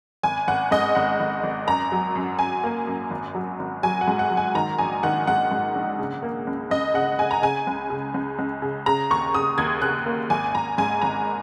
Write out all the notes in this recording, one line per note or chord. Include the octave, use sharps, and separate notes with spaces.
G#1 G#5
G#1 F#5
G#2 D#5
G#1 F#5
G#1
G#1
F#2 A#5
F#3
F#2
F#2 G#5
A#3
F#2
G#1
F#3
G#1
F#3 G#5
F#5
G#2
F#5
F#3
G#5
D#3 A#5
A#1 G#5
D#3 F#5
G#2 F#5
G#2
A#1
C#3
A#3
C#2
C#2 D#5
C#3 F#5
C#3 G#5
A#5
C#3 G#5
C#2
C#3
C#2
C#2
C#3
C#3 A#5
D#2 C#6
C#3 D#6
D#2 G#6
C#3 F#6
A#3
G#1 G#5
G#1 A#5
G#2 G#5
G#1 A#5